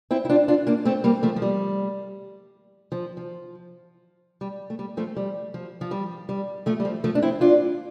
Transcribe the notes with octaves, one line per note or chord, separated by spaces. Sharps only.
C4 E4
E4
D4 F4
D4 F4
A#3 D4
A3 C4
G3 A#3
F3 A3
F3
G3
F3
F3
G3
A3
G3
F3 A3
G3
F3
F3
G3
G3
F3 A3
G3
F3
F3 A3
D4
C4 E4
D4 F4